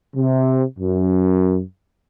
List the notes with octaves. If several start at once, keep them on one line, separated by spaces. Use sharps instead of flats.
C3
F#2